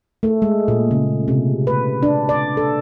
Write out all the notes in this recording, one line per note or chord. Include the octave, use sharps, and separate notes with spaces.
A3
G#3
A#2
C#3
C3
B4
D4
D5
A4